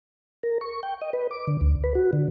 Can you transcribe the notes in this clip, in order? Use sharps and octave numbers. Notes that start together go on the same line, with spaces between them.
A#4
C#6
G5
D#5
B4
D6
D3
D2
B4
F#4
D3